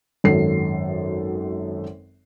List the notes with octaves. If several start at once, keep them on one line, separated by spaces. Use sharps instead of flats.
G#1 F#2 A4 C7